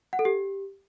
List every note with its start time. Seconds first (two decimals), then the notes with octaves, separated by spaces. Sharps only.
0.13 F#5
0.19 A4
0.25 G4